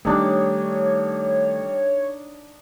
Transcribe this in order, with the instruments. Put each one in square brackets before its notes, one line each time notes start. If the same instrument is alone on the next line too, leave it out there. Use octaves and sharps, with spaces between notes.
[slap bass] D#3 A3 [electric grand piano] G3 [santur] D4 D#4 E6 [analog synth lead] C#5